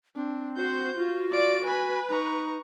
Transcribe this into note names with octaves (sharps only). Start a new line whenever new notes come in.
C4 D4
F#4 C5 G6
F4 F#4
F4 D5 D7
B4 G#5 B5
D#4 A#5 C#6